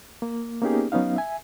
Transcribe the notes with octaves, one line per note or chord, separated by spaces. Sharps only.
A#3
A#3 B3 C#4 D#4 G4 G#4
F#3 B3 C#4 D#4 F5
E5 G#5